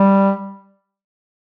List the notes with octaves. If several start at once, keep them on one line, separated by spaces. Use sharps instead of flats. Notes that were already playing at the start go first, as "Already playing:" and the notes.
Already playing: G3